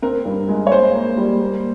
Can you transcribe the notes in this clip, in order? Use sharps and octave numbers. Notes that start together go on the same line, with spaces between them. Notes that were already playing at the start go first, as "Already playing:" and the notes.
C4 A#4
G2
G#3
C#5
A#3 C5
A#3
G3
A#3